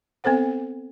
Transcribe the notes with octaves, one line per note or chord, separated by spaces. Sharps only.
B3 C4 A4 C5 F#5